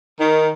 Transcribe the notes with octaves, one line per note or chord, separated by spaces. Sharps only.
D#3